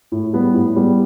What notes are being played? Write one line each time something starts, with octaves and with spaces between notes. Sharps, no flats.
A2
G3 B3
A2
G3 B3